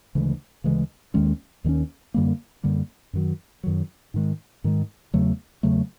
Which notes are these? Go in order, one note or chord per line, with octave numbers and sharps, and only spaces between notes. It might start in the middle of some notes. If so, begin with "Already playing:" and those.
D2 C#3 E3 G#3
D2 C#3 E3 G#3
D#2 D#3 G#3 C#4
D#2 D#3 G#3 C#4
F#2 D3 G3 A#3
F#2 D3 G3 A#3
F#2 D#3 F#3
F#2 D#3 F#3
G#2 D#3 G#3
G#2 D#3 G#3
E2 C#3 F#3 A3
E2 C#3 F#3 A3